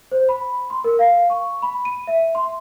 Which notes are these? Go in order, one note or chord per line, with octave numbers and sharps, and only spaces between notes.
C5
B5
C6
A#4
F5
C#6
B5
D#7
E5
C6